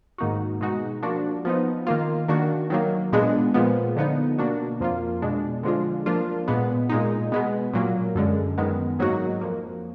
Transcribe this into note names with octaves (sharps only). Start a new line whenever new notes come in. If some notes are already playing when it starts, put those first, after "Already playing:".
G#2 D#3 A#3 D#4 F#4
B2 G#3 D#4 F#4
F3 A#3 D4 F#4
F3 B3 D#4
D#3 A#3 F4
D#3 A#3 D4 F#4
D#3 F#3 A#3
A#2 G#3 B3 D4
A#2 F3 G#3 B3
D3 F3 B3 D#4
B2 A#3 D4 F#4
F2 F3 A#3 F4
B2 G#3 D4
D3 F3 G#3 D4 F4
F3 A#3 D4 F4
A#2 G#3 B3
A#2 G#3 D#4
B2 G#3 B3
A#2 F#3 A#3
F#2 D3 G#3
F#2 D#3 G#3 B3
G#2 F#3 A#3 D#4 F#4
F2 F3 A#3